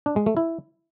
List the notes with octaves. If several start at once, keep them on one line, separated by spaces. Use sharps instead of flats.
D4
G#3
A3
E4